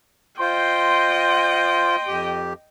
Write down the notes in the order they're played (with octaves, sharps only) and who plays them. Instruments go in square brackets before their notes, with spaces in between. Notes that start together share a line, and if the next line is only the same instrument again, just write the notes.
[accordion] F4 C5 [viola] D#5 G5 [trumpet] C6
[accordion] F2 G4